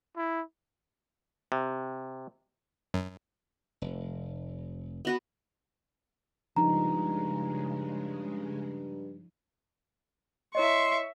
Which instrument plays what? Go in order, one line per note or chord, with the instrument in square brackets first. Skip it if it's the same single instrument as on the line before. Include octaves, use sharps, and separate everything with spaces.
[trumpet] E4
[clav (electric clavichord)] C3
[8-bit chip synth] F#2
[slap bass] F1
[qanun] B3 F#4 B4
[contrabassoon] G2 [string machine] C#3 G#3 [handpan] F3 D#4 [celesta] A#5
[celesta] E4 C#5 D#5 [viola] E5 C#6 [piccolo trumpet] C6